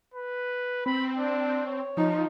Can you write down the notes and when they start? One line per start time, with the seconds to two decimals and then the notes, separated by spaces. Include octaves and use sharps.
0.14 B4
0.86 C4 B5
1.17 D4
1.66 C#5
1.97 F3 D#4